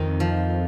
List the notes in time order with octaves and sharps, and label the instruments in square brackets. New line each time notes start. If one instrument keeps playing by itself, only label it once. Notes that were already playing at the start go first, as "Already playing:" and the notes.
Already playing: [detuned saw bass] F2 [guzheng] D#3 C4 D#4
[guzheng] F3